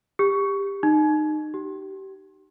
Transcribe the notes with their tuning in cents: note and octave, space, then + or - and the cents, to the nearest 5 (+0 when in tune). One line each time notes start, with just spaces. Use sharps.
G4 +20
D#4 -20
G4 -30